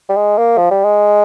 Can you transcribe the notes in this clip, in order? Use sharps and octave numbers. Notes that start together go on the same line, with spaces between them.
G3
G#3
A#3
F3
G3
G#3